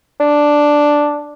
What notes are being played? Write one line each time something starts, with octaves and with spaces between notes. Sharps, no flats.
D4